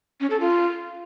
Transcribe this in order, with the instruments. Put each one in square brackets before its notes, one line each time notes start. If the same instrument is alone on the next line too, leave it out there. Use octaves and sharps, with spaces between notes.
[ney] C#4
A4
F4